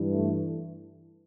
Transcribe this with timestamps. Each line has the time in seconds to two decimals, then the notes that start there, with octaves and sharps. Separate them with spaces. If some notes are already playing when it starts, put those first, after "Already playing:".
Already playing: G2 E3
0.12 A3